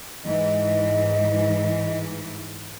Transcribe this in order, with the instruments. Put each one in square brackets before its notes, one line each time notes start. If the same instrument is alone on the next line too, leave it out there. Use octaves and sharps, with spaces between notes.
[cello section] G#2 E3 [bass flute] D#5